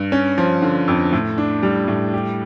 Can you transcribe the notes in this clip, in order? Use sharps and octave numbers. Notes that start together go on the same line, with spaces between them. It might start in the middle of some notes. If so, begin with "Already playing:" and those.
Already playing: G2
C#4
F3
D3
F2
A2
D4
G3
A2
G4